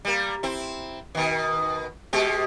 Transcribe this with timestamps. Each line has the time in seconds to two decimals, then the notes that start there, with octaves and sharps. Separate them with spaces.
0.05 G3 A#3
0.43 C4 E4
1.15 B2 D#3
2.13 B2 G#3 G4